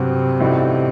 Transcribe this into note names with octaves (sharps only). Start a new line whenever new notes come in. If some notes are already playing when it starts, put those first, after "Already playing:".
Already playing: G2 C3 F#3 C4 F#4
A1 A2 G3 D#4 F#4